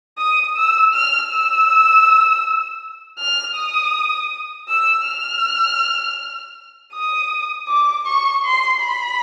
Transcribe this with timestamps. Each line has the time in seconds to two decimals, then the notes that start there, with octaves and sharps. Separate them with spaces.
0.18 D#6
0.56 E6
0.94 F6
1.31 E6
3.19 F6
3.56 D#6
4.68 E6
5.06 F6
6.93 D#6
7.68 D6
8.06 C#6
8.44 C6
8.82 B5